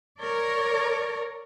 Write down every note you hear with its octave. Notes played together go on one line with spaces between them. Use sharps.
A#4 C#5 D5